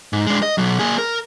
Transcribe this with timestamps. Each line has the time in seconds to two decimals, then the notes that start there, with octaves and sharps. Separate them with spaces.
0.13 G#2
0.27 G#3 D4
0.43 D#5
0.58 B1 F#3
0.79 A#3 G#4
0.98 A#4